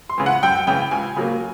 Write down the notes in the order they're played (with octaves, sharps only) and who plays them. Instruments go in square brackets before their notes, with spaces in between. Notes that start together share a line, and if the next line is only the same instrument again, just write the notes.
[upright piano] C6
C#3 E3
F#5
F#2 G5
C#3 E3 G5
C#2 G#5
C#3 F#3 A#3